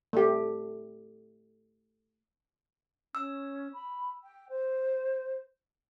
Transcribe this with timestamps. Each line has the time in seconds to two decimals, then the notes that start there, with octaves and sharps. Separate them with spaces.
0.13 A3 G4
3.15 C#4 E6
3.73 B5
4.23 G5
4.49 C5